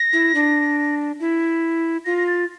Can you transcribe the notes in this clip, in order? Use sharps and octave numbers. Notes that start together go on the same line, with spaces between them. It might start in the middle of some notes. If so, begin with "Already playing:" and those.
Already playing: A#6
E4
D4
E4
F4 A#6
A#6
A6